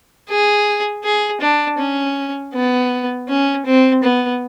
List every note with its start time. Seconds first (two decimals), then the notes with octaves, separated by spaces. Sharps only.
0.29 G#4
1.04 G#4
1.41 D4
1.79 C#4
2.53 B3
3.28 C#4
3.66 C4
4.03 B3